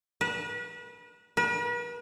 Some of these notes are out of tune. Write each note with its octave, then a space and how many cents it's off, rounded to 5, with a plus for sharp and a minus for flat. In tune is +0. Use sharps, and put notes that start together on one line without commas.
B4 -35
B4 -45